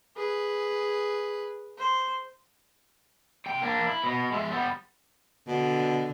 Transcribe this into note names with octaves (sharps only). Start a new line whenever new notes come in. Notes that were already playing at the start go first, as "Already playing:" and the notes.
G#4 B4
C5
C3 G5
A#3 D4
E4
B2
G#3 E5
G3 B3
B2 D3